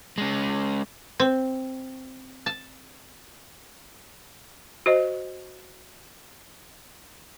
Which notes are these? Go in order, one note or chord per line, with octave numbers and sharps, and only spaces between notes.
G#3 C#4
C4
A5
F#4 C5 D#5